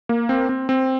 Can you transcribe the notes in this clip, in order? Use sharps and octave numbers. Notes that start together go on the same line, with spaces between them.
A#3
C4
C4
C4